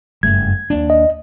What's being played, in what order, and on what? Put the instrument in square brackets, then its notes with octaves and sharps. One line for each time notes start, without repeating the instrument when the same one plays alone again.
[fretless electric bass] F#1 G2 A3 [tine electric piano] G#6
[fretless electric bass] D#2 A#3 D4
[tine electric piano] D#5